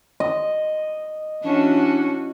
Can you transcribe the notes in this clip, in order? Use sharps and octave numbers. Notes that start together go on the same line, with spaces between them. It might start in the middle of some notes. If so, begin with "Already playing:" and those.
D#5
E3 C#4 D4 F#4